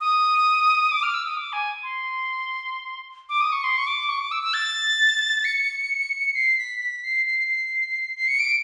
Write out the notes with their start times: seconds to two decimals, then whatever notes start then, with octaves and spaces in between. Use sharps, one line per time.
0.01 D#6
0.92 D6
1.03 F6
1.14 E6
1.26 D#6
1.37 D6
1.53 G#5
1.83 C6
3.29 D6
3.41 D#6
3.52 C#6
3.64 C6
3.78 C#6
3.87 D6
4.09 C#6
4.20 D6
4.32 E6
4.43 E6
4.54 A6
5.45 C#7
6.35 C7
6.58 B6
6.80 B6
7.04 C7
7.26 C7
8.17 C7
8.28 C#7
8.39 D7